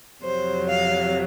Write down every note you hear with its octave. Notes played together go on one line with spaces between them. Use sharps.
F2 C3 F#3 C5
F5